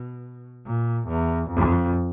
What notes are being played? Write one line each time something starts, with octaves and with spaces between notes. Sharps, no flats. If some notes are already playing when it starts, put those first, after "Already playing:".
Already playing: B2
A#2
E2
F2